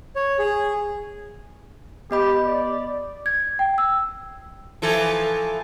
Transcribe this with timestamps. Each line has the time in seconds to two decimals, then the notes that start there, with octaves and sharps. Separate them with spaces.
0.16 C#5
0.39 G#4
2.11 B3 G4 D#5 B5
2.46 D5
3.26 G#6
3.59 G5
3.78 E6
4.82 E3 F3 A4